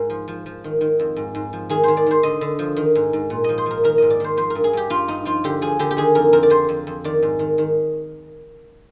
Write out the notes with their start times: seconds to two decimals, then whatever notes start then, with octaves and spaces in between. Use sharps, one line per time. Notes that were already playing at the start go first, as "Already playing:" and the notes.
Already playing: G#2 A#4
0.10 F3
0.28 F3
0.46 F3
0.64 D#3
0.81 D#3
1.00 F2
1.16 G#2
1.35 G#2
1.53 F3
1.70 D#3 G#4
1.84 D#3 C5
1.97 D5
2.07 D#3 C5
2.23 D3 D#5
2.41 D3
2.59 F3
2.77 D#3
2.95 G#2
3.13 G#2
3.30 A#2
3.44 F3 D#5
3.58 C5
3.66 F3 A#4
3.84 D#3 A#4
3.98 G#2 D#5
4.10 D5
4.20 D#3 C5
4.37 F3 C5
4.50 A#4
4.55 G2
4.64 G#4
4.73 G2 G4
4.90 G2 F4
5.08 G2 D#4
5.25 F3 F4
5.44 D3 G4
5.62 F3 G#4
5.79 D3 G4
5.91 G4
5.97 D#3 G#4
6.15 F2 A#4
6.33 F2 A#4
6.43 D5
6.50 F2 C5
6.69 F2
6.87 F2
7.04 D#3 D5
7.22 G#2
7.39 D#3
7.58 D#3